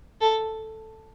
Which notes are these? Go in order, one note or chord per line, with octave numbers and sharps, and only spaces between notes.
A4